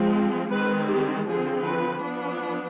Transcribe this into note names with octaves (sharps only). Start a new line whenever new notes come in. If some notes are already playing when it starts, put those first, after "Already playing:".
Already playing: F3 G#3 C4
D#3 G#3 C4 B4
G4
D3 F3 C4 G#4
B4
F3 B3 D4